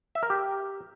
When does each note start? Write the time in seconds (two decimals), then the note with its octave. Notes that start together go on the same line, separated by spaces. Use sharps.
0.15 E5
0.23 A#4
0.30 G4